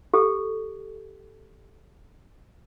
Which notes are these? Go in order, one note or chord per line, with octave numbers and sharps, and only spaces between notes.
G4 A4